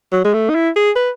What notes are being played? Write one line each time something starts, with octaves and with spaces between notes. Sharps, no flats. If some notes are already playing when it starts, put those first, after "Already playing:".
F#3
G#3
A3
D#4
E4
G#4
B4